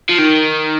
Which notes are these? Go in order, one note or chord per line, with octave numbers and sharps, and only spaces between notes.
F3
D#3